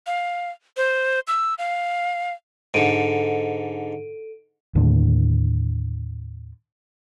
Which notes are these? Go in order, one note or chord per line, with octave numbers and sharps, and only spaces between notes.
F5
C5
E6
F5
G#2 D3 A4 D7 D#7
D#2 A2 D3